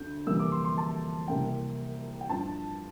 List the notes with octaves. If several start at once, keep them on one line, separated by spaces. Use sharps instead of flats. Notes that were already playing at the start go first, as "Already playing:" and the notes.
Already playing: D2 D3 C4 G6
F2 C3 E3 G3 A#3 E6
D6
C6
C6
A5
C2 C3 G3 A#3 E4 G5
G5
G2 F3 C4 A5